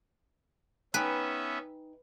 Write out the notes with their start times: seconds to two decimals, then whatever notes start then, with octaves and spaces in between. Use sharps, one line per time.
0.94 B3 C#4 D#4 B4 E5 G5 G#5